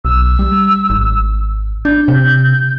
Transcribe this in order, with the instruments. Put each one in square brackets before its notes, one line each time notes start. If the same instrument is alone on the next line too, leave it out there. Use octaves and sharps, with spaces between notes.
[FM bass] B1 [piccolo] E6
[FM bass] G3
G#1
[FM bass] D4 [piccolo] G6
[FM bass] C3